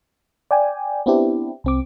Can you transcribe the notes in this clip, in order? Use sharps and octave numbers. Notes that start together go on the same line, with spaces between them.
D5 G5 G#5
B3 C4 D4 E4 G4
C2 C4 D6